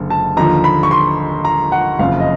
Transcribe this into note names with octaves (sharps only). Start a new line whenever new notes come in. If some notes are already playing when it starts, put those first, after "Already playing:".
Already playing: F#1 D3
A5
D#2 D3 F3 A#5
B5
C#6
C6
A#5
F#5
F#1 F2 C#3 F5
D#5